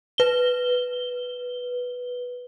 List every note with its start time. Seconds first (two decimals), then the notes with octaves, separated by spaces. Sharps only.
0.18 B4 G7